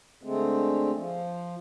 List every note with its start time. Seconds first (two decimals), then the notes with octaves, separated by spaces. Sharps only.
0.23 D3 G#3 A3 C4
0.96 F3